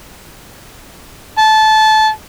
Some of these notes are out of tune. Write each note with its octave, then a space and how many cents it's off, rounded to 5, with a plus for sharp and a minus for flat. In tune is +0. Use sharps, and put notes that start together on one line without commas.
A5 -20